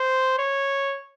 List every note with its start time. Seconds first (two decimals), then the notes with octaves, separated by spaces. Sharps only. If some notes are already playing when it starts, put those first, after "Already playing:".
Already playing: C5
0.39 C#5